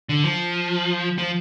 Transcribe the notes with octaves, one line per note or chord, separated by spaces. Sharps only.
D3
F3
F3